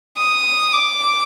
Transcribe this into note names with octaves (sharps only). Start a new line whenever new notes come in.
D#6
D6